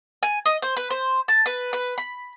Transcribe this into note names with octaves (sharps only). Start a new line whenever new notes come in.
G#5
D#5
C5
B4
C5
A5
B4
B4
B5